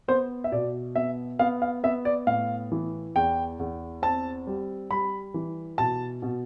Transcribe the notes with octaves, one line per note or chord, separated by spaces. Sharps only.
B3 C5
E5
B2 D5
B3 E5
B3 F5
F5
B3 E5
D5
A2 F5
E3
E2 G5
E2
C4 A5
G3
G3 B5
E3
B2 A5
B2